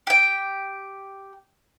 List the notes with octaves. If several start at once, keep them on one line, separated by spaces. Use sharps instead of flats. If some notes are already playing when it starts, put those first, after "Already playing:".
G4 G5